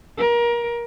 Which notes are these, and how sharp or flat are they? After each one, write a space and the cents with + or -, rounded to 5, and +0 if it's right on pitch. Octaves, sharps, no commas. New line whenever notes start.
A#4 +25